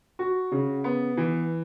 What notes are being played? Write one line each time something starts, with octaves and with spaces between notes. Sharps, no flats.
F#4
C#3
B3
E3